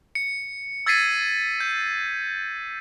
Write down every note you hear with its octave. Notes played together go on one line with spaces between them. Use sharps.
C#7
E6 G#6 A6 B6 C7 D#7
G6